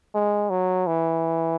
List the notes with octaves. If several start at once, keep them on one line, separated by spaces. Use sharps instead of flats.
G#3
F#3
E3